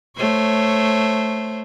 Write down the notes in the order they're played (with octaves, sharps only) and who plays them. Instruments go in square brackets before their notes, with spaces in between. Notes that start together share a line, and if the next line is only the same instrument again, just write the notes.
[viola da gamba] A3 C5 C#5